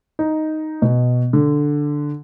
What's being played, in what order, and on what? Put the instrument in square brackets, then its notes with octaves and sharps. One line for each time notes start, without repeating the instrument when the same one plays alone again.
[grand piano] D#4
B2
D3